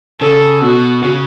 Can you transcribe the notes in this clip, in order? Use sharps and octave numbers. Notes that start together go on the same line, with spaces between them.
C#3 A4
B2 F#4
C#3